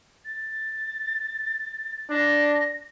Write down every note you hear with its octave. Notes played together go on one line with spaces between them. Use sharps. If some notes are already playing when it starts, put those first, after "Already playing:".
A6
D4 A#6